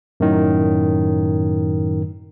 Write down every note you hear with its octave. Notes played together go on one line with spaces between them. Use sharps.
F#2 A2 D#3